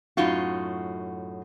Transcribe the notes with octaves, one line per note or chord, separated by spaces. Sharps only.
F#2 A2 D#4 F4 F#4